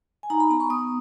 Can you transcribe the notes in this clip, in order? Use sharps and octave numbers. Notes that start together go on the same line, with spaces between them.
G#5
D#4 A#5
B5
B3 A#5
C#6
B3 D#6